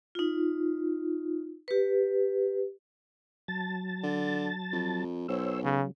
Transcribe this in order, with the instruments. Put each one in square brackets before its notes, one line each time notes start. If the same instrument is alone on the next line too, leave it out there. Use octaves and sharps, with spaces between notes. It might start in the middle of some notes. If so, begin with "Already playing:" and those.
[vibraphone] D#4 F4
G4 B4
[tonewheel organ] F#3 A5 A6
[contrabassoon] D3
F2
[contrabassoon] B1 [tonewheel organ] C5 C#5 E6
[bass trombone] C#3 [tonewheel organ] F#3